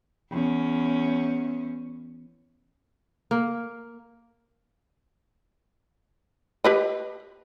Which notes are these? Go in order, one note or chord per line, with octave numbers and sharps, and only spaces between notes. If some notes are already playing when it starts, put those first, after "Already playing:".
E2 C#4
A#3
G4 B4 D#5